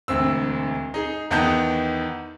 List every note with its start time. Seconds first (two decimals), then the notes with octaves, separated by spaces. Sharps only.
0.08 E1 D2 C4 E6
0.94 D#4 G#4
1.31 E2 D#3 B3 D#4 A5 G6